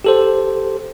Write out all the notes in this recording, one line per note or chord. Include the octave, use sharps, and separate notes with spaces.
G4 A4 C5